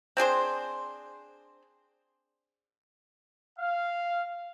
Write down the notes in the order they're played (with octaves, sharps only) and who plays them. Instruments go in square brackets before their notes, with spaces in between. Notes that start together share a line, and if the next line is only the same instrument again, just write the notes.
[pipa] C4 D4 G#4 C5
[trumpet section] F5